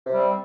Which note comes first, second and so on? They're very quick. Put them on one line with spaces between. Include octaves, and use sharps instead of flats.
C3 G3 C4